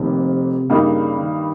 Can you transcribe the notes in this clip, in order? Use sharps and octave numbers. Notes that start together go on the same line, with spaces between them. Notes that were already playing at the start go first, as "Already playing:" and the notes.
Already playing: F1 F2 C3 D#3 A#3
G2 C#3 G3 A#3 D#4
D#3